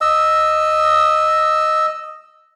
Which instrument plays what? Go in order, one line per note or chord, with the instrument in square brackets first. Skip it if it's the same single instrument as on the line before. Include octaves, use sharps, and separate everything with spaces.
[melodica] D#5 E6